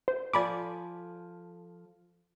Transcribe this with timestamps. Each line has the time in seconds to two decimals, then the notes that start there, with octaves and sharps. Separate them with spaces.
0.08 C5
0.33 F3 A4 D5 G#5 B5 D6